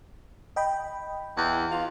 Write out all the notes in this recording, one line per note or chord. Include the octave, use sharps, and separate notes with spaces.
D#5 G5 B5
E2
F4